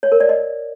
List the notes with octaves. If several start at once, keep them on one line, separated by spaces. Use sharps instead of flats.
C#5
A#4
D5
D#5